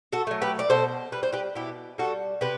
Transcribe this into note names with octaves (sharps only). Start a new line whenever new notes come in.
F#4 A4
F#3 A3
G4 B4
D5
B2 A4 C5
G3 B4
C5
G4 B4
B2 E4 G4
G3 F#4 A4
C3 G4 B4